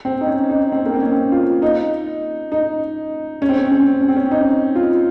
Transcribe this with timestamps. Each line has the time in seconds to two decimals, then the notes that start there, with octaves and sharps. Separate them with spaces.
0.05 C4
0.21 D#4
0.27 C#4
0.50 D#4
0.72 C4
0.86 A#3
0.94 C4
1.02 C#4
1.32 F4
1.62 D#4
2.52 D#4
3.42 C#4
3.49 C4
3.56 C#4
3.72 C4
4.01 C#4
4.08 C4
4.16 C#4
4.31 D#4
4.75 F4